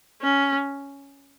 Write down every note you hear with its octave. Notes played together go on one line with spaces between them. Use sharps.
C#4